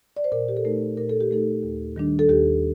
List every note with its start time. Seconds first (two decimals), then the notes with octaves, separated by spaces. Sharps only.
0.17 D5
0.24 C5
0.32 A#2 A#4
0.49 G4
0.57 A4
0.65 A3 D#4 A#4
0.97 A#2 A#4
1.09 A4
1.21 G4
1.31 A3 D#4 A4
1.63 D#2
1.96 D#3 G3 D4
2.19 A4
2.29 D#2 G4